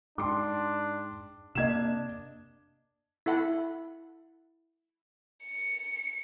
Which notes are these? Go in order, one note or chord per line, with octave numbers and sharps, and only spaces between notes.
G#2 D4 G5 C6 D6
C3 A#3 D4 D#5 G#6 E7
E4 A4 F#5 B5
C#7